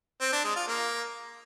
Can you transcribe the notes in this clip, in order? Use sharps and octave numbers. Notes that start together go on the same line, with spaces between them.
C4
D4
G#3
F4
A#3